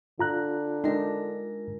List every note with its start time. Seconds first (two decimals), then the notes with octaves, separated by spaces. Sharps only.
0.19 D3 F4 A#5 F#6
0.84 G#3 D4 D#4 A#4